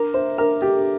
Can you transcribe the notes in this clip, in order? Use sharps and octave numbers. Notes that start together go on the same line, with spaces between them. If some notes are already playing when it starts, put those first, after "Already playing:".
Already playing: D4 A#4
C5 E5
D4 A#4
G4 A4